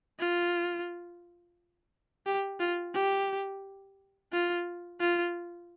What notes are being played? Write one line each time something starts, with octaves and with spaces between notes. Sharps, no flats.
F4
G4
F4
G4
F4
F4